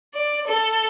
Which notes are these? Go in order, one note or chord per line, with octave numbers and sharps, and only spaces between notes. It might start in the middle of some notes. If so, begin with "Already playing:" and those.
D5
A4